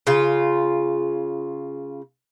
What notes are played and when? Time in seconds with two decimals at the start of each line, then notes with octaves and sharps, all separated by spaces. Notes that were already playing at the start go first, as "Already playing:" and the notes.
0.07 C#3 F4